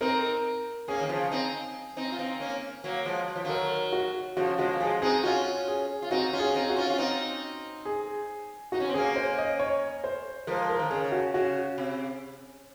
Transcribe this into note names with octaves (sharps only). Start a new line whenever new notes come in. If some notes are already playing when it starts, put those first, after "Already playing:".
C4 D#4 A#4
A#3 C#4 G#4
D#3
C#3 F3
C4 D#4
C4 D#4
F4
C4 D#4
A#3 C#4
F#3 A#3
F3 G#3
F#3
F3
D#3 F#3 A#4
F#4
C#3 F3 F#4
F3 G#3 F#4
A#3
F3 G#3 G#4
C4 D#4 G#4
C#4 F4 F#4
G#4
F4
C4 D#4 F#4
C#4 F4
G#4
C4 D#4
F#4
C#4 F4
F4
C4 D#4
G#4
D#4 F#4
C#4
C4
A#3 C#4 G#4
C5
D#5
C#5
C5
F3 G#3 A#4
A#4
D#3
C#3 G#4
F#4
C#3 F#4
C3